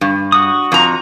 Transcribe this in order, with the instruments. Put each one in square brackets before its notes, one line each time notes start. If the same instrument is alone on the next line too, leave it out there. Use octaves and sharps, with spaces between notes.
[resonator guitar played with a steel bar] G2
[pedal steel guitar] F#4 D#6
[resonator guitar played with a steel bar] F2 A#5